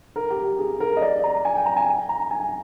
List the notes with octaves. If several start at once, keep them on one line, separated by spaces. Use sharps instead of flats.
A#4
G4
G4
G#4
A#4
D#5
D5
A#5
G#5
G5
A#5
G#5
A#5
G#5